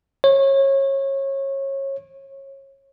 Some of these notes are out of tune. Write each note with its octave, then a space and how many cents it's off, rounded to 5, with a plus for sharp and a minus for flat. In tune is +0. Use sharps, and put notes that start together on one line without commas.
C#5 -25